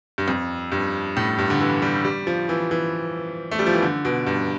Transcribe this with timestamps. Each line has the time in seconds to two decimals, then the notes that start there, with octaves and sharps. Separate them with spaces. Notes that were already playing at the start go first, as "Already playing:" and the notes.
0.18 G2
0.28 F2
0.72 G2
1.17 A2
1.39 G2
1.50 D3
1.60 E3
1.82 G3
2.05 G3
2.27 F3
2.49 E3
2.71 E3
3.51 A3
3.59 G3
3.67 F3
3.74 E3
3.82 D3
4.05 B2
4.27 G2